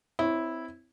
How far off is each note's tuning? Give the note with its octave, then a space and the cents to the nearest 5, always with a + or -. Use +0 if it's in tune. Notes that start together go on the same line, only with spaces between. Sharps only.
C4 -20 E4 -10 C#5 +0